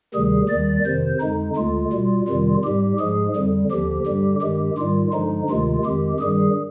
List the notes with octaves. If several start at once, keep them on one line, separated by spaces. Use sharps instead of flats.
D2 C3 D#3 G3 G#4
D#2 D#3 G3 D5
F2 C3 D#3 C5
F2 D3 G#3 D#4
D2 D3 G#3 F4
B2 G3
F2 C3 D#3 G3
G#2 G3 G4
G#2 F3 G#3 G#4
F2 D3 G3
D#2 D3 F3 G4
G2 D3 G3
G2 D#3 G#3 G4
G#2 D#3 G3 F4
G2 D3 F3 G#3 D#4
D2 C3 D#3 G#3 F4
F2 D#3 G#3 G4
G2 D#3 G3 G#4